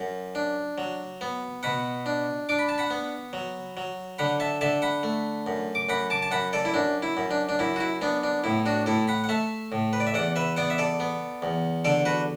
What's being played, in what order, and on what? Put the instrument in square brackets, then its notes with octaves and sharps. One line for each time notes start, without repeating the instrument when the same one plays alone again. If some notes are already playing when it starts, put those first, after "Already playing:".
Already playing: [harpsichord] F#2
D4
F#3
B3
B2 F#5 B5
D4
D4 D6
B5
A5
F#5 B5
B3
F#3
F#3
D3 F#5 B5
E5 A5
D3 E5 A5
F#5 B5
A3
F#2
D6
F#2 F#5 B5
A5 D6
A5
F#2 F#5 B5
A4 D5
E4
F#2 D4
E4
F#2
D4
D4
F#2 E4
F#4
E4
B3 D4
D4
A2 E4
D4 F#4
A2 E4 A4
F#5 B5
F#5
A3 E5 A5
A2
B4
D5
E5
E2 D5 F#5
B4 E5
B3 D5 F#5
E5
A4 D5
B3
E2
D3 A4 D5
F#4 B4